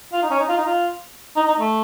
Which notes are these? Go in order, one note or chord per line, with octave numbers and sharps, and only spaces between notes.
F4
D#4
C#4
D#4
F4
D#4
F4
D#4
D#4
A3